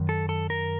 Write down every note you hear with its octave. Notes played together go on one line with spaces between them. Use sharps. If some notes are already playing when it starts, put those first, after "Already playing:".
Already playing: F#2 D#3
A4
A4
A#4